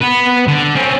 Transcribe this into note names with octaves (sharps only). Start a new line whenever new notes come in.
B3 B4
D3
C4 C#4